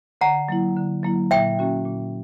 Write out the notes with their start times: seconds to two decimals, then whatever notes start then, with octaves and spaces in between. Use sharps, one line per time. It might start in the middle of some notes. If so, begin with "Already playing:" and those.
0.21 D3 F#5 A#5
0.49 F#3 A#3 E4
0.77 D3
1.03 F#3 A#3 E4
1.31 A#2 E5 G5
1.59 A#3 C#4 F#4
1.85 A#2